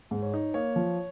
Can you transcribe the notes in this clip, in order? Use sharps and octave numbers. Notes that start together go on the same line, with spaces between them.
G#2
C#5
D#4
A#3 C#5
F3